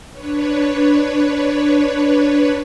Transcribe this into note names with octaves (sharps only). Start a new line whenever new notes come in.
D4 B4 C#5